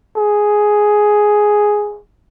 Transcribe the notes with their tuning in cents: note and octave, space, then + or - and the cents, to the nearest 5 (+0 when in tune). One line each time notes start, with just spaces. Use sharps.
G#4 +5